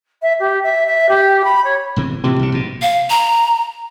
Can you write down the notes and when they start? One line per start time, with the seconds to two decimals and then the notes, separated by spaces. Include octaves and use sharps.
0.22 E5
0.40 G4
0.63 E5
0.86 E5
1.09 G4
1.44 B5
1.64 C#5
1.96 E1 C3 E3
2.24 A2 C3 E3 F3
2.39 C2 C#3
2.52 A#1 G#2 B2
2.82 F5
3.10 A#5